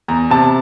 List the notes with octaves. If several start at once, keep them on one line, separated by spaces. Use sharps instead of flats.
E2 A#5
C3 A5